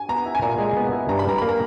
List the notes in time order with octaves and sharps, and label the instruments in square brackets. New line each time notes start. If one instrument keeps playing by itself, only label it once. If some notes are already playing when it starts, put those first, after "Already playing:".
Already playing: [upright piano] G#5
[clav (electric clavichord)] B3 [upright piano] A#5
[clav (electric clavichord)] E4
[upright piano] G#5
[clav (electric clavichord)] A#2 [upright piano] A#5
[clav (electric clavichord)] G#3
B3
E4
[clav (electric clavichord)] G2 [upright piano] A#5
[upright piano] B5
[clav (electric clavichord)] G3 [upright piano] A#5
[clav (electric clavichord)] A#3 [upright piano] B5
[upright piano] A#5